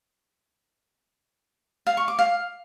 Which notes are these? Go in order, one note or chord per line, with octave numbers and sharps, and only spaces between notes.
F5
C#6
D6
F5